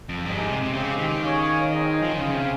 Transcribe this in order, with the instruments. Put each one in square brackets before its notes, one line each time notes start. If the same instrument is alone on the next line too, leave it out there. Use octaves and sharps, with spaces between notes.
[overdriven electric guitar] F2
[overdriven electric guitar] G2 [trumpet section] G#3 C4 G4
[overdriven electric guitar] G#2
C3
C3
[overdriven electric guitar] C#3 [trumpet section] G#3 C4 G4
[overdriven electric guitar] D#3
[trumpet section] C#4 G#4 C#5 F5
C4 D#4 G#4 D#5
[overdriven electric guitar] F3
D#3
[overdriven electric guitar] C#3 [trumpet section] C#4 G#4 C5 F5
[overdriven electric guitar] C3